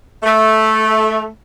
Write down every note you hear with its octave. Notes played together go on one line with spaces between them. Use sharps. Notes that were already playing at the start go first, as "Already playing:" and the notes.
A3